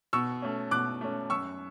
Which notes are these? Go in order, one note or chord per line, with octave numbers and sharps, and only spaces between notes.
B2 C#6 E6
A3 C#4
B2 D6 F#6
A3 C#4
F#2 C#6 E6